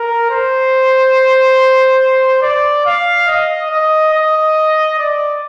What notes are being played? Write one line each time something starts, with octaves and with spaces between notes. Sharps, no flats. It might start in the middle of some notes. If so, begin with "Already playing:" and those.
Already playing: A#4
C5
D5
F5
D#5
D#5
D#5
D5